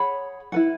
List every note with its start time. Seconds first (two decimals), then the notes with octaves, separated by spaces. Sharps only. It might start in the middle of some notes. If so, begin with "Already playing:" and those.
Already playing: G#4 C#5 F#5 B5
0.52 E4 B4 F#5